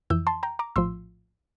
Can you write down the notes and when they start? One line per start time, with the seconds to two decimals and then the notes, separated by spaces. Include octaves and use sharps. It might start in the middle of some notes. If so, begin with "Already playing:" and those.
0.10 F2 E3 E6 G6
0.27 A5 C6
0.43 G5 A#5
0.59 A#5 D6
0.76 A#1 A2 F3 C6 E6